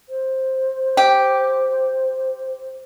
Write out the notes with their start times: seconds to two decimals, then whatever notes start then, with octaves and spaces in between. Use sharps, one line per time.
0.09 C5
0.97 G4